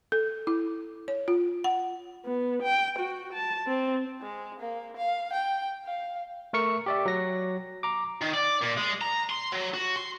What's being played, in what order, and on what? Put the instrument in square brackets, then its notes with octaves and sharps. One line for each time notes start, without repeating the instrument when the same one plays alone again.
[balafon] A4
E4
C#5
F4
F#5
[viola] B3
G5
F#4
A5
C4
[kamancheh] G#3
A#3
F5
G5
F5
[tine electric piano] A3 A#4 C#6 C#7
G4 D5 E5
F#3 A#6
A#5 D6
[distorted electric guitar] D#3
D5
A#2
G#3
A#5
C6
F#3
F#4
C6